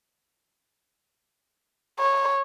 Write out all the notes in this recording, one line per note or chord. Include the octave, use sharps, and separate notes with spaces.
C#5